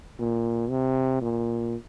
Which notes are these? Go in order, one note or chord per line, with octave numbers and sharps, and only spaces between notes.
A#2
C3
A#2